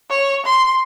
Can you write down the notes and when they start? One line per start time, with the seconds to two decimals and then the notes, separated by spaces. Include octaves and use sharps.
0.10 C#5
0.46 C6